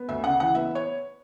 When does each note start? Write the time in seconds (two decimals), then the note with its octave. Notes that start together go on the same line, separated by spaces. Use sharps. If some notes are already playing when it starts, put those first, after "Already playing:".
Already playing: B3
0.08 D2 E5
0.24 C#3 F#5
0.40 E3 F#5
0.55 B3 E5
0.75 C#5